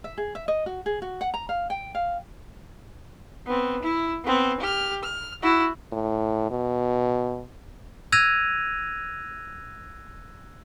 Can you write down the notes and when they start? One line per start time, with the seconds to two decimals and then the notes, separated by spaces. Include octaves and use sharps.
0.04 E5
0.18 G#4
0.35 E5
0.48 D#5
0.66 F#4
0.86 G#4
1.02 F#4
1.21 F#5
1.34 A#5
1.49 F5
1.70 G5
1.95 F5
3.46 B3 C4
3.82 E4
4.24 B3 C4
4.60 G4 F6
5.03 F6
5.43 E4 F#4
5.92 A2
6.51 B2
8.12 E6 F#6 G#6 A#6 D#7 F7